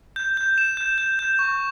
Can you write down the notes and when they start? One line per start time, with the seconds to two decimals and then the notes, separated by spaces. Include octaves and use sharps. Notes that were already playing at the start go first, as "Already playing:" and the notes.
0.16 G6
0.37 G6
0.58 E7
0.77 G6
0.98 G6
1.19 G6
1.39 C#6